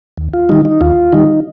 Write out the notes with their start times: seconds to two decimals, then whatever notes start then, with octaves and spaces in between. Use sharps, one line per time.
0.17 D#2
0.34 F4
0.49 D#3 G3 D#4
0.65 D#4
0.81 D#2 F4
1.13 D#3 G3 D#4